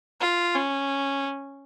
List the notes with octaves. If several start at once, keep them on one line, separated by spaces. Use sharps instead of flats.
F4
C#4